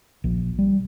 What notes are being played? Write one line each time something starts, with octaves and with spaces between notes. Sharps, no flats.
A#1
G3